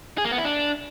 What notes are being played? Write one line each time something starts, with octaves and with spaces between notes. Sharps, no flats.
G#4
A#3
B3
E4
D4